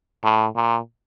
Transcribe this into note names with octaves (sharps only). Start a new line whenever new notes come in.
A2
A#2